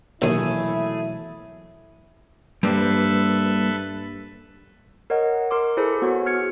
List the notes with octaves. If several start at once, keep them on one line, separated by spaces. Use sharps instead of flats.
A#1 D#2 B2 E3 F#3 A3 E4 G#4
G2 G3 A#3 G4 A4 B4 C5 E5
A#4 C#5 D#5 F#5
A#4 C6 D6
E4 G#4 A4 C5
B3 F#4 G#4 C#5
F6 G#6 C#7